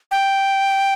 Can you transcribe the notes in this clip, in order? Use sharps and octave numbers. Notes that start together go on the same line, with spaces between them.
G5